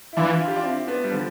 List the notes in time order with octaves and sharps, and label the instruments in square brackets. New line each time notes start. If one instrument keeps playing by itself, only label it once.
[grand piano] E4
[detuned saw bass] E3 [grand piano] D4 F4
[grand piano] F4
G4
D4 F4
C4 E4
E4
B3 D4
G3
D3 F3